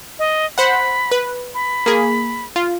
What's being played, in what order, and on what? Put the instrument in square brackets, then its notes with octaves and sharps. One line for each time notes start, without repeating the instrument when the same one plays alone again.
[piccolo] D#5
[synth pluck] C5 F#5 [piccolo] B5
[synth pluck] B4
[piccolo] B5
[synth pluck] A#3 G#4
F4